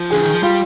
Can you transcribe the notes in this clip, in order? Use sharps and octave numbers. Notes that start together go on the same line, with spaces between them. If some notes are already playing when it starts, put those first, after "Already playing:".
Already playing: F3
D3 G#4
D#3
F3
G3 F4